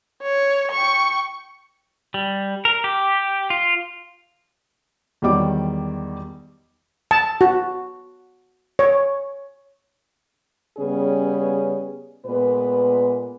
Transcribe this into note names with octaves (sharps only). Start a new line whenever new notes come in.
C#5
G5 C#6
G3
A#4
G4
F4
E2 D#3 F#3 G3 D5 D6
A5
F#4
C#5
C#3 G3 B3 C#4 G#4
A#2 G#3 B3 B4